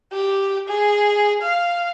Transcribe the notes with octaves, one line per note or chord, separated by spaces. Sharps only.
G4
G#4
F5